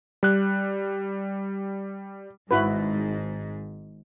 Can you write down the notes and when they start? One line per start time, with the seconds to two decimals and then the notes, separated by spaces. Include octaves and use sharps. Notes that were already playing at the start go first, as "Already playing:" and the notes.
0.23 G3 F#6
2.51 G#1 G#2 E4 F#4 B4